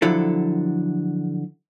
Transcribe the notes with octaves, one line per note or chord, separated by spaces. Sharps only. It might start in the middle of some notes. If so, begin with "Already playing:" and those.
D3 F3 F#3 E4 A4